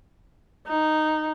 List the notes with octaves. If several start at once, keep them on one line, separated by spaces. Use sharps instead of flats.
D#4